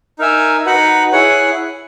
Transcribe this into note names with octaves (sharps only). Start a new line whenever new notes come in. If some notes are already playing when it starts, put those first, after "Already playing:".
D#4 A#4 E5 G#5
D#4 F#4 B4 F#5
E4 G#4 C#5 F#5